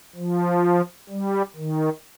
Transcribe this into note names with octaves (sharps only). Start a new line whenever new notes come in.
F3
G3
D#3